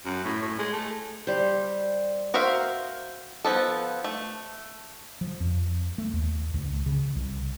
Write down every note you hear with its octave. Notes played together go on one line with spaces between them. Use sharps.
F#2
A2
A2
G#3
A3
G3 C5
F#4 A#4 C5 E5 F5
F3 B3 A4
A3
F3
F2
A3
D#2
C#2
C#3
C2